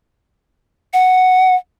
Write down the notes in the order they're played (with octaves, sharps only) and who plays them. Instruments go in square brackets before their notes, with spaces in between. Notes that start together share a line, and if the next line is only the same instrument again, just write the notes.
[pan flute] F#5